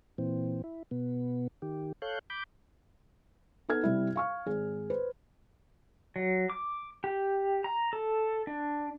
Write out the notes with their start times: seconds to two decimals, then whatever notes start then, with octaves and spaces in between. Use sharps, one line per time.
0.18 A#2 E3 C4
0.64 E4
0.91 B2 B3
1.62 D#3 G4
2.02 A4 C#5 F5 F#6 G6
2.30 B5 D6 G6
3.69 B3 D#4 A4 F6 G#6
3.83 C3 G3 E4
4.16 F5 C#6 F6
4.46 G#1 G#4
4.90 B4 C5
6.16 F#3
6.50 D6
7.04 G4
7.64 A#5
7.93 A4
8.47 D4